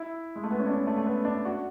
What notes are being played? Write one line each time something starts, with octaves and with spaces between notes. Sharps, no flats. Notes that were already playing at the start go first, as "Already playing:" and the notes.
Already playing: E4
G#3
A3
B3
C#4
D4
A3
A3
B3
D4
F#4